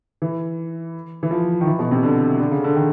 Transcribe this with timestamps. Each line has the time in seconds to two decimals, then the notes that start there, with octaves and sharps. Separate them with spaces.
0.22 E3
1.23 E3
1.31 F3
1.61 D#3
1.67 E3
1.79 B2
1.91 C3
2.03 D3
2.40 D3
2.52 C#3
2.64 D3
2.76 D#3